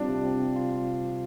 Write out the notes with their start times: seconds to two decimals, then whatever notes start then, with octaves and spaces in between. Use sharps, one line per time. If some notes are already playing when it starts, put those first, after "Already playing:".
Already playing: G3 C4 D4 F4
0.09 C3
0.24 C4
0.41 C3
0.56 F4